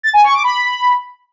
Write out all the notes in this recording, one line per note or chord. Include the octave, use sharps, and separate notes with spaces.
A6
G#5
C#6
D6
B5